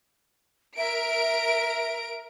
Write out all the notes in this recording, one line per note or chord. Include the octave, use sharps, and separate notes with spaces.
A#4 E5 D7